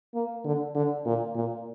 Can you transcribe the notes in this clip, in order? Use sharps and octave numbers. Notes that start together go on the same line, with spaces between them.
A#3
D3
D3
A#2
A#2